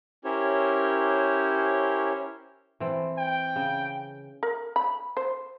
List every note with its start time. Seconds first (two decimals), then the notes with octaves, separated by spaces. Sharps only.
0.25 C#4 E4 G4 A#4 C5 C#5
2.80 E3 C4 A4
3.17 G5
3.56 C#3
4.43 A#4
4.76 B5
5.17 C5